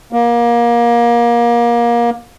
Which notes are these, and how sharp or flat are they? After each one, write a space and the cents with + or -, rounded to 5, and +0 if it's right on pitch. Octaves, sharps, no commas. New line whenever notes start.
A#3 +25